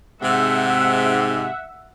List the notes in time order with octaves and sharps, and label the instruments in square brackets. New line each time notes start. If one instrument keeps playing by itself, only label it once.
[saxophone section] G#2 C3 [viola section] E5 F#5